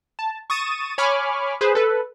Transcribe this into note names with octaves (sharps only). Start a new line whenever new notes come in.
A5
C#6 D#6 A6 D#7 E7
C#5 G#5 B5 C#6 D6 F6
G#4 B4 C5
A4 B4